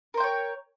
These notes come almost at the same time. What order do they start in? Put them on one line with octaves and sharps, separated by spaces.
A#4 C5 G5 C#5